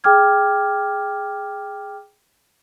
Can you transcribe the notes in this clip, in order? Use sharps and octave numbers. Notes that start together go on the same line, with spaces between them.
G#4 G5 D6 F6 G#6